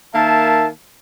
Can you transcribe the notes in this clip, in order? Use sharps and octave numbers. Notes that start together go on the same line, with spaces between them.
D#3 A#3 E5 A5